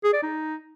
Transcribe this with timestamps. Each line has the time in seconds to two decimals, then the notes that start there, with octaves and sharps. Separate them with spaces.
0.04 G#4
0.13 D5
0.23 D#4